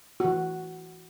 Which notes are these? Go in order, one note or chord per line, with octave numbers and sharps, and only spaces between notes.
E3 F#4